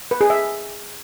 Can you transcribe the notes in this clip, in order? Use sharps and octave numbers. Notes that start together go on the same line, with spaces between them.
B4
G#4
E5